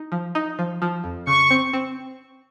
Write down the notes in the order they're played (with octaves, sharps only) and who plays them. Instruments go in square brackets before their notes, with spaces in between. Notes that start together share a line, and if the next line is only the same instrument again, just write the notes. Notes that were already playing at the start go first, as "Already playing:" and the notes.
Already playing: [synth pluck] D#4
F3
D#4
F3
F3
F2
[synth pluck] C#3 [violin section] C#6
[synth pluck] C4
C4